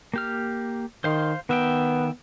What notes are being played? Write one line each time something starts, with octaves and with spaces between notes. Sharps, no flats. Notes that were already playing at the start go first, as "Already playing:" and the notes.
A#3 G4 F6
D#3 C5 F5 C6
D#3 B3 E5 G5